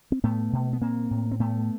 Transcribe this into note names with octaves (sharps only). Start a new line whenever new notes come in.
C4
A2 A3 B3
B2
B3
A#2 A#3 C4
A2
C4
A2 A3 B3